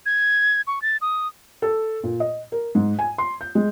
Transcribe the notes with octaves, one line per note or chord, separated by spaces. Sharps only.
G#6
C#6
A6
D#6
A4
A#2
D#5
A#4
G#2
G#5
C6
G6
G#3